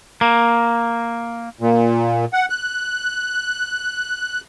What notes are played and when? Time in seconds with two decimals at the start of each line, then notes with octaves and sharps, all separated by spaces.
0.21 A#3
1.61 A#2
2.33 F#5
2.50 F#6